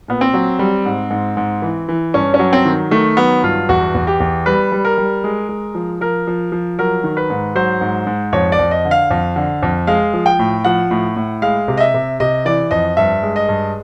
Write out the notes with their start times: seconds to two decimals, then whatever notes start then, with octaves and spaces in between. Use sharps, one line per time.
0.08 A#2 B3
0.21 C4
0.34 F#3
0.59 G3
0.86 G#2
1.10 G#2
1.37 G#2
1.62 E3
1.89 E3
2.14 G2 C#4
2.34 C#4
2.39 F#3
2.53 C4
2.65 D#3
2.91 D#3 A3
3.17 F#3 B3
3.43 G2 F4
3.69 E2 F#4
3.95 E2
4.07 G4
4.20 E2
4.46 G3 B4
4.72 G3
4.85 A#4
4.98 G3
5.24 G#3
5.49 G#3
5.75 F3
6.01 F3 A#4
6.27 F3
6.52 F3
6.79 F#3 A#4
7.04 D#3
7.17 B4
7.30 G#2
7.55 F#3 C5
7.81 G#2
8.07 G#2
8.33 F2 C#5
8.52 D5
8.59 F2
8.71 D#5
8.85 D3
8.91 F5
9.11 F2
9.36 D3
9.62 F2
9.87 G#3 F5
10.13 F3
10.26 G5
10.39 A2
10.65 F3 F#5
10.91 A2
11.16 A2
11.42 G#3 F5
11.68 C3
11.77 D#5
11.80 E5
11.94 C3
12.20 C3 D#5
12.45 E3 D5
12.71 F2 D#5
12.97 G2 E5
13.23 G#3
13.36 D#5
13.49 G2